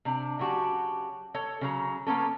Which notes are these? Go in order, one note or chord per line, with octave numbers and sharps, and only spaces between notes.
C3 D4
C#3 F#3 F#4 G4 A5
A4 C#5
C#3 F#3 A#5
A#3 B3 C#4 A4